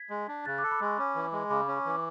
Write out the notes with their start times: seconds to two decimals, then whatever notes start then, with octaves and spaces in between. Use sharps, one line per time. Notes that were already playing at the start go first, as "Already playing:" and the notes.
Already playing: G#6 B6
0.10 G#3
0.28 D4
0.46 C#3 F#6 A6
0.58 A4 D6 F#6
0.71 B5 D6
0.81 G#3 C#6 E6
0.98 C#4 B5 D6
1.15 E3
1.32 G#3
1.50 C#3 B5 D6
1.68 C#4
1.76 C#6
1.85 E3 D6